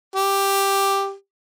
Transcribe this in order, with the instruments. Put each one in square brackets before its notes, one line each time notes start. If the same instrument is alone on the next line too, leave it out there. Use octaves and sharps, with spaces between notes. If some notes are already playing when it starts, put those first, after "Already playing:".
[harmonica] G4